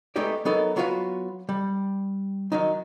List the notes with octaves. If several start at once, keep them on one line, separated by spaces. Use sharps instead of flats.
G#3 A3 B3 D#4 G4 D5
F#3 B3 D#4 A4 A#4
F#3 B3 F4 F#4 B4 F5
G3
D#3 F#3 D#4